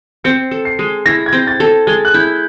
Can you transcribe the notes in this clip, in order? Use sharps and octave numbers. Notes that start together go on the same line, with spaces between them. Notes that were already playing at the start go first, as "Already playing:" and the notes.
C4 C#7
A4
C7
G#3
E4 A#6
G#6
C4
A6
A4
G#3 G#6
F#6
E4 G6